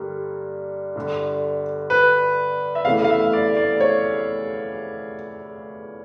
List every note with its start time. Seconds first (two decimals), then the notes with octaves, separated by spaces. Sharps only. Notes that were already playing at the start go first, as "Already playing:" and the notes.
Already playing: G2 D3 G3 A#3
0.96 G1 G2 D3
1.90 B4
2.75 E5
2.85 F1 E2 C#3 E3 A3 F5
3.04 F5
3.10 E5
3.33 D5
3.57 D5
3.80 C#5